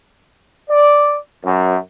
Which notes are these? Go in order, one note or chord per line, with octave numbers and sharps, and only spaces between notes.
D5
F#2